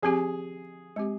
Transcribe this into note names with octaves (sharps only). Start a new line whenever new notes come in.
F3 C4 G4 G#4
G#3 C4 G4